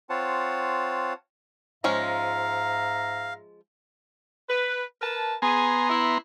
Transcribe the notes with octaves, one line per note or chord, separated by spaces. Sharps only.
C4 F4 C#5 F#5 A5
G#2 F3 G#3 C#4 E5 F5 A#5
B4
A#4 B4 A5
B3 G#4 G#5 A#5 C6
E4